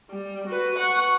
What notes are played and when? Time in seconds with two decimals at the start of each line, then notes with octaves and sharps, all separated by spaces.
0.11 G3
0.47 F#4 B4
0.79 F#5 C#6